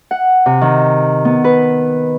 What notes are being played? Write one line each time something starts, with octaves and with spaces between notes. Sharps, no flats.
F#5
C3
D#3
B3
B4